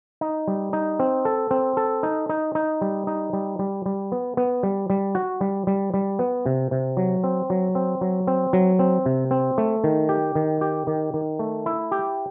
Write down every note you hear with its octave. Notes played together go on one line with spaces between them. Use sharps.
D#4
G3
D#4
C4
A4
C4
A4
D#4
D#4
D#4
G3
D#4
G3
G3
G3
B3
B3
G3
G3
F#4
G3
G3
G3
B3
C3
C3
F#3
C4
F#3
C4
F#3
C4
F#3
C4
C3
C4
A3
D#3
G4
D#3
G4
D#3
D#3
A3
E4
G4